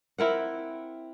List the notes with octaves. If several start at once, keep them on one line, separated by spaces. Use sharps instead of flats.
C4 E4 A#4 F#5